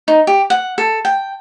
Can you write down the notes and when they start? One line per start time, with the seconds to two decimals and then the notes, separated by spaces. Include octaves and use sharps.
0.08 D#4
0.27 G4
0.50 F#5
0.78 A4
1.05 G5